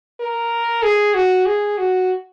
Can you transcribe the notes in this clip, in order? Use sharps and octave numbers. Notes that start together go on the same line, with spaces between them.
A#4
G#4
F#4
G#4
F#4